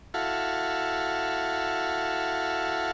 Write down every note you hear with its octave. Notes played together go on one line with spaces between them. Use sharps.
E4 F#4 A4 F5